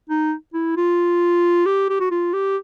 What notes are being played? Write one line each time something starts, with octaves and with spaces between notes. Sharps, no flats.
D#4
E4
F4
G4
G4
F#4
F4
G4